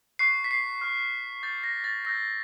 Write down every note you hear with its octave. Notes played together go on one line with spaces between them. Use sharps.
C#6 F#6 C7
B6
C7
C#6 F6
D6 G6 A6
A#6
A6
C#6 E6 G6 A#6